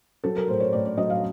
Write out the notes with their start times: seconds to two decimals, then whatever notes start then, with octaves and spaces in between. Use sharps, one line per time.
0.24 F#3 A4
0.36 A#4
0.48 A2 C5
0.60 C#5
0.73 A2 D5
0.85 D5
0.97 F#3 D#5
1.10 F5